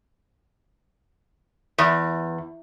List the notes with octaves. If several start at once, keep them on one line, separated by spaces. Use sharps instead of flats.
E2